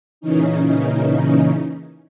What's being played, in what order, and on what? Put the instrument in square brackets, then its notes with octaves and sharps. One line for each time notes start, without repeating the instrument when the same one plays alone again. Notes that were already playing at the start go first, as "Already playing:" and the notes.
[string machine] A#2 C#3 E3 C#4 D#4